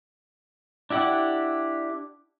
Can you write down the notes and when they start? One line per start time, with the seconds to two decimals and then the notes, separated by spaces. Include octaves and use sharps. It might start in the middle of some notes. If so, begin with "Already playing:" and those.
0.90 D4 E4 G4 F#5